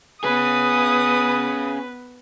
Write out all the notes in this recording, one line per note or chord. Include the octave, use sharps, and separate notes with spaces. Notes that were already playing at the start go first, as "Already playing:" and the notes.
B3 C#4 G#4 B4 D#6